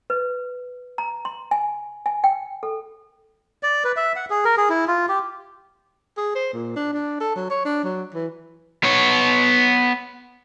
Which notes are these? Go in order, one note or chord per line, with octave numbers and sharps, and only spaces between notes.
B4
A#5
C6
G#5
G#5
G5
A4
D5
B4
E5
F#5
G#4
A#4
G#4
E4
F4
G4
G#4
C5
A#2
D4
D4
A4
F#3
C#5
D4
F#3
E3
B3 C#5